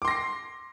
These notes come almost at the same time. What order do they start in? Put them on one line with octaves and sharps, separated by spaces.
D6 C6 A#6 C7